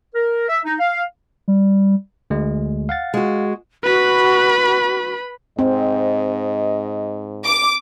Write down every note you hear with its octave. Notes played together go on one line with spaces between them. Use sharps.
A#4
E5
D#4
F5
G3
D2 G#3
F5 F#5 A6
G#3 F#4
F#4 B4 B5
G#2 C4 D#5
D6